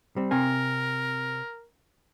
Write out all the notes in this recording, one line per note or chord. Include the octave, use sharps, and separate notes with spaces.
G3 C4
C3 C4 A#4 G#5